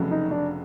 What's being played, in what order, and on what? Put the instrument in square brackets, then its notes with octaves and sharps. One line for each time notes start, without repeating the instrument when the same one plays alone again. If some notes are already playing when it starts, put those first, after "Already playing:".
Already playing: [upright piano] F1 F2 C#3 F#3 A3
[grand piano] D#4
D4